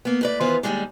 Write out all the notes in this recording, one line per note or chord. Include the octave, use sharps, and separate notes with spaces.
A#3 B3
A2 B4 D5
D#3 E3 B3 F4 B4 C5
D#2 A#2 G3 G#3 D4